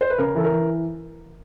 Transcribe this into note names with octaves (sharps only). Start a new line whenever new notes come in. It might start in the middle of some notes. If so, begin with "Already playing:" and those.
C5
B4
C#3 A#4
E3 A4
A#4
E3